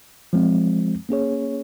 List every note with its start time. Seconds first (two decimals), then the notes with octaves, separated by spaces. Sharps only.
0.33 F3 G#3 C4
1.09 A#3 C#4 G#4 C#5